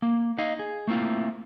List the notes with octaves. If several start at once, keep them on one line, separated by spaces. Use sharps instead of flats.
A#3
D#4 D#5 F5
G#4
A3 A#3 C4 E4 F4